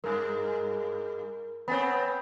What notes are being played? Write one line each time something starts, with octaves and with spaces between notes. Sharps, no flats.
G2 G#3 A#4
B3 C4 C#5 G#5 B5